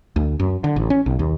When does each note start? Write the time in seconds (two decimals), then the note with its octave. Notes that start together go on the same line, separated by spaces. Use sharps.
0.16 D2
0.40 F#2
0.64 D3
0.76 A1
0.90 C#4
1.06 B1
1.19 D#2